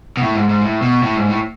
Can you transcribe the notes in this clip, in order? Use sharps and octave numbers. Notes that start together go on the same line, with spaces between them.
B2
A2
G#2
G#2
A2
B2
A2
G#2
A2